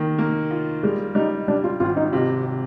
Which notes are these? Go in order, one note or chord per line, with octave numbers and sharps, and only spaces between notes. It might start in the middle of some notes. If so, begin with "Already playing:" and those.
Already playing: D#3 A#3
A#3
F4
G3 G#3
G3 D#4
G3 D4
F4
G#1 F4
D#4
C3 F4
C3